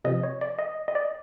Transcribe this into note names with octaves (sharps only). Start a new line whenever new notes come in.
C3 F3 D#5
C#5
D5
D#5
D#5
D5